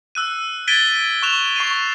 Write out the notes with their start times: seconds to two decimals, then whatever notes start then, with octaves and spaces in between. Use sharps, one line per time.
0.15 E6 F#6 D#7
0.68 G#6 A6 B6 D7 D#7 G7
1.23 C#6 F#6 E7 F7
1.56 C#6 C7 D#7